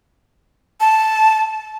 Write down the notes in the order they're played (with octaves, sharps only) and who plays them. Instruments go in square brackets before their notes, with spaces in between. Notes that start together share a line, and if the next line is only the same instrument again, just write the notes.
[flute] A5